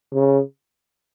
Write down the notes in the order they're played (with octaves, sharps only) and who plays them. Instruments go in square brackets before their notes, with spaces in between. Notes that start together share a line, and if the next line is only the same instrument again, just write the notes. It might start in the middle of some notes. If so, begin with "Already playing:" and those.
[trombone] C#3